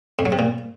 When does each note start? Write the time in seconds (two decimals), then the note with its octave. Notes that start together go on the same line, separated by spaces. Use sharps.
0.19 F2
0.26 F#3
0.32 C3
0.39 A#2